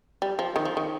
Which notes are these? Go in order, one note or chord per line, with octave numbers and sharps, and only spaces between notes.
G3
F3
D#3
F3
D#3